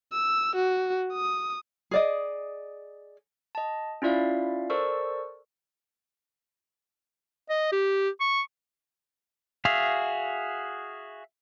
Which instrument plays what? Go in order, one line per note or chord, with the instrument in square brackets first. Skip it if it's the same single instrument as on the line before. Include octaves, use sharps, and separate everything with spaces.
[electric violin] E6
F#4
D#6
[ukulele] G#4 D5 D#5
[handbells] D#5 A5
C#4 E4 F4 D5 E5 F5
A4 A#4 C5 D5 C#6 E6
[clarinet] D#5
G4
C#6
[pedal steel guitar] F#4 G#4 E5 F5